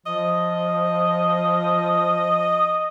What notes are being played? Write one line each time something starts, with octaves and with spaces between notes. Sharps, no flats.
F3 D#5